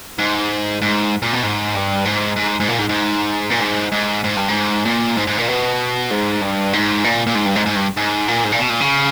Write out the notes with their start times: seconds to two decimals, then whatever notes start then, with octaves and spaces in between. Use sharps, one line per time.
0.19 G#2
0.82 G#2
1.22 A#2
1.33 B2
1.43 G#2
1.75 G2
2.05 G#2
2.36 G#2
2.60 G#2
2.68 A#2
2.79 G#2
2.89 G#2
3.51 A#2
3.61 G#2
3.92 G#2
4.24 G#2
4.36 G2
4.49 G#2
4.85 A#2
5.17 G#2
5.27 G#2
5.38 A#2
5.48 B2
6.11 G#2
6.41 G2
6.73 G#2
7.04 A#2
7.27 A#2
7.35 G#2
7.46 G2
7.56 G#2
7.66 G#2
7.76 G2
7.97 G#2
8.28 A#2
8.44 G#2
8.52 A#2
8.59 B2
8.70 A#2
8.80 C#3